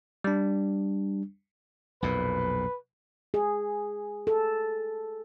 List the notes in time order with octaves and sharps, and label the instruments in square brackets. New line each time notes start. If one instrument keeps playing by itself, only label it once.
[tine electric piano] G3 D4
[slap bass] B1 F2 A#2 [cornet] B4
[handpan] G#4
A4